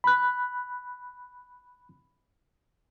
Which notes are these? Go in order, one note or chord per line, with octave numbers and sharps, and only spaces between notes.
B5 F#6